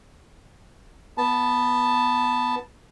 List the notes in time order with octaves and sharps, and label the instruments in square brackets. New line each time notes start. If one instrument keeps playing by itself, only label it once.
[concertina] B3 A5